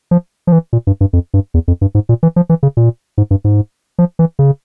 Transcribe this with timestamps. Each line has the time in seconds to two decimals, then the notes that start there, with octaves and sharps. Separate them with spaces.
0.11 F3
0.47 F3
0.52 E3
0.73 A#2
0.87 G2
1.01 G2
1.13 F2
1.34 G2
1.54 E2
1.68 F2
1.81 G2
1.95 G#2
2.09 A#2
2.23 E3
2.36 F3
2.49 E3
2.63 C#3
2.77 A#2
3.18 G#2
3.31 G2
3.44 G#2
3.99 F3
4.19 E3
4.39 C#3